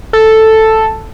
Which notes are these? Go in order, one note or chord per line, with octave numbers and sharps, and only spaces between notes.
A4